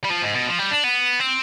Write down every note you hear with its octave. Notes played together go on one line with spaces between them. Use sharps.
G3
F3
G#2
B2
F3
G3
D4
B3
C4